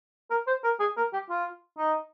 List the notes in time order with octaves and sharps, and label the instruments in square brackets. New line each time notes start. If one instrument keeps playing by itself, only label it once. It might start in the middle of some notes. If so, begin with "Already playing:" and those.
[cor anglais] A#4
C5
A#4
G#4
A#4
G4
F4
D#4